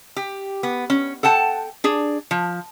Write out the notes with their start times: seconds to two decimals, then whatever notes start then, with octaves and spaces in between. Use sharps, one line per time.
0.16 G4
0.63 B3
0.90 C#4
1.23 A4 F#5 G5 A5
1.84 D4 G#4
2.31 F3